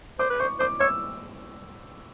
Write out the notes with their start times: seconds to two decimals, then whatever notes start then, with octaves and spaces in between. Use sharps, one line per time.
0.19 C5 D6
0.30 B4
0.40 C5 C#6
0.60 C5 D6
0.80 C#5 E6